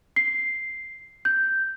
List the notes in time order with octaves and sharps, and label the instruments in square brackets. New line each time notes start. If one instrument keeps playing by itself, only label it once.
[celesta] C7
G6